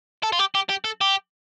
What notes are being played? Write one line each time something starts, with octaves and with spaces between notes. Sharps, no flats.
A4
F4
G4
G4
G4
A4
G4